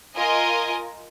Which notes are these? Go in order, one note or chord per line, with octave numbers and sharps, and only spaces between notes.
F4 A#4 D#5 G#5